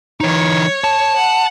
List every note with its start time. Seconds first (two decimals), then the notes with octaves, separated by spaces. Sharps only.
0.20 E3 D#4 C#5
0.84 A5
1.16 F#5